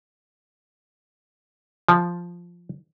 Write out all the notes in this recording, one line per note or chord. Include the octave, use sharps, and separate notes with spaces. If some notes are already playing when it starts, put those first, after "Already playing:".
F3